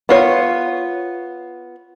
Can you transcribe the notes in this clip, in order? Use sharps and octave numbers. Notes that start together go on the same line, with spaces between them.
B3 F4 C#5